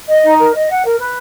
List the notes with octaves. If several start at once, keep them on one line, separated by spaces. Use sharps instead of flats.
D#5
D#4
A#4
D#5
F#5
A#4
B4